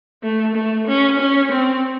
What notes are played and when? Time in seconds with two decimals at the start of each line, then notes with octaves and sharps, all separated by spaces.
0.23 A3
0.55 A3
0.87 C#4
1.19 C#4
1.52 C4